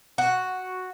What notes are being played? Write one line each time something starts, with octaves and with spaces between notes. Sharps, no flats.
F#4